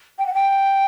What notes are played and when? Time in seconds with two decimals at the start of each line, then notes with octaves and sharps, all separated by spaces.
0.18 G5
0.27 F#5
0.34 G5